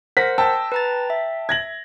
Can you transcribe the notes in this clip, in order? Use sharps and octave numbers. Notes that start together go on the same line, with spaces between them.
A#4 C5 F#5 A#6 B6
G5 A5 E6
B4 A#5 A6
E5
G#6 A#6 F#7